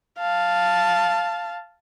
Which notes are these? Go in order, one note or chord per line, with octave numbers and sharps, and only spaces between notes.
F5 A5